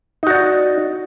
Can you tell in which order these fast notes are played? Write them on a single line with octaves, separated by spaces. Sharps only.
D#4 F#4 D5 F#5